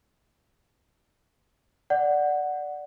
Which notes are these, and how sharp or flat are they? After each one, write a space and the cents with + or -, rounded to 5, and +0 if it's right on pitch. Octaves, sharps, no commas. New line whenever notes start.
D5 +0 F#5 +0